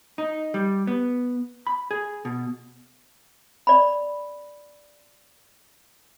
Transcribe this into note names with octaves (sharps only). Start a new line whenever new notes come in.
D#4
G3
B3
B5
G#4
B2
D5 B5